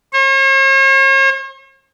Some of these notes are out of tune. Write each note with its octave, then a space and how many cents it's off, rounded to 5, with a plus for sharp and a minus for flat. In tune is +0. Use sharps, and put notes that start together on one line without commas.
C#5 -45